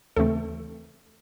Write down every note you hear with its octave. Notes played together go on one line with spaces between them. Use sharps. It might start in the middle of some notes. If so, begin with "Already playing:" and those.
D#2 C#3 E3 A3 C4 A4